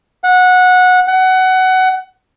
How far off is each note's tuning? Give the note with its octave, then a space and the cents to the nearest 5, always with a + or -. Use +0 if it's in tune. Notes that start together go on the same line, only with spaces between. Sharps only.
F#5 -15
F#5 +20